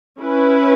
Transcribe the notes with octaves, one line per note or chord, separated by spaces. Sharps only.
C#4 E4 B4